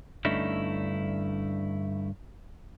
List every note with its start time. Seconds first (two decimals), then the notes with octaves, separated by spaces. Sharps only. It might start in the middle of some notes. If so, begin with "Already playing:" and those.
0.25 G2 D3 A3 C#4 D#4 E4